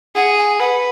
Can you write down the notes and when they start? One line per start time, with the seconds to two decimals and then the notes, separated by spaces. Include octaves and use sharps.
0.15 G#4 F#5
0.37 G#5
0.59 B4 F#5